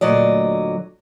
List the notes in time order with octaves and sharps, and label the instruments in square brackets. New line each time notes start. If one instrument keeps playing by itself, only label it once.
[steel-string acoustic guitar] D2 A#2 F#3 D5 D#5